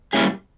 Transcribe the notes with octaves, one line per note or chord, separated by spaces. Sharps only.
G3 A#3 C#4 E4 G#4